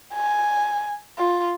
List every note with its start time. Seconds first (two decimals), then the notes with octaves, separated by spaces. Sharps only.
0.14 G#5
1.18 F4